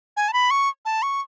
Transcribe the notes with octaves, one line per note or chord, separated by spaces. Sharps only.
G#5
A5
B5
C#6
A5
C#6